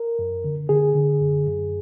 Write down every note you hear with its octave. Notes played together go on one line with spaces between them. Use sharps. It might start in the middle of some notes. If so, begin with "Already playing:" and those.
Already playing: A#4
F#2
D3
D3 G#4
D3
F#2
F#2